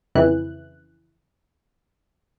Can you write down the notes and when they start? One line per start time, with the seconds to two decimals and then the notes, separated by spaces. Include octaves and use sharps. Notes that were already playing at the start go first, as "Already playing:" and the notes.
0.15 F2 C#3 E3 E4 F#6